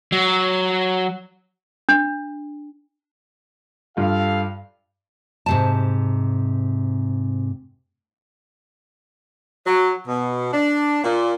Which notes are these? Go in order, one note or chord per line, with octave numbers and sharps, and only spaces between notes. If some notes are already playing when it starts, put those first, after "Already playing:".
F#3
D4
G2 F4 G4 A4 F5
G#2 C3 A5
F#3
B2
D4
A#2